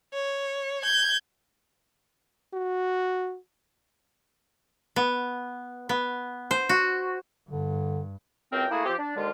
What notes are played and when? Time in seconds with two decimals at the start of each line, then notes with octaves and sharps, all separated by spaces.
0.14 C#5
0.83 G6 G#6
2.53 F#4
4.96 B3
5.89 B3
6.51 C5
6.69 F#4
7.49 G2 D3
8.53 C#2 F#2 C4 A#4 G5
8.71 A3 A#3 E4 F#4 G#4
8.86 F3 C4 G4
8.99 D4
9.17 D#2 D3 G#3 F4